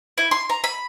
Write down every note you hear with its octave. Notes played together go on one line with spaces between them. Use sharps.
E4
C6
A#5
B5